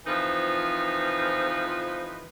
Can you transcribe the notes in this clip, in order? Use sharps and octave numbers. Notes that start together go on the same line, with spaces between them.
F2 E3 F3 D#4 B4